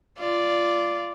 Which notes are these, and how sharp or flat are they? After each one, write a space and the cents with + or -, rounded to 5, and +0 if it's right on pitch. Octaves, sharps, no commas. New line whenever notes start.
F4 -15 D5 -5